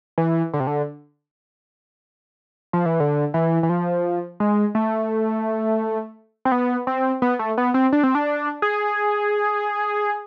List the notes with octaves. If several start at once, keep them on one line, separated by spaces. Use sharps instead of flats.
E3
D3
C3
D3
F3
E3
D3
E3
E3
F3
G#3
A3
C4
B3
C4
B3
A3
B3
C4
D4
C4
D4
G#4